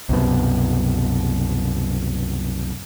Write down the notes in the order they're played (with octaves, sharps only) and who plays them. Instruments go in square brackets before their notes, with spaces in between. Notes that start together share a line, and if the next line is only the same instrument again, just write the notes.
[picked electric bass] C2 F#2 B2